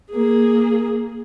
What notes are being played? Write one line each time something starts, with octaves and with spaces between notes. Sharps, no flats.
A#3 G#4